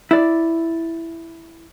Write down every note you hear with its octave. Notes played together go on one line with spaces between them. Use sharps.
E4 D5